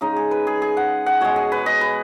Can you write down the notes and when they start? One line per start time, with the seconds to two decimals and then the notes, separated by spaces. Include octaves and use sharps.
0.01 C#3 G#3 D#4
0.16 G#4
0.31 B4
0.47 G#4
0.62 G#4
0.77 F#5
1.06 F#5
1.21 B2 G#3 C#5
1.36 G#4
1.52 B4
1.66 D#5
1.81 B4